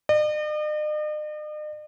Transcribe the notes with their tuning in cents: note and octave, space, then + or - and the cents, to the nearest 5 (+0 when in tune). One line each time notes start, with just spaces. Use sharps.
D#5 -45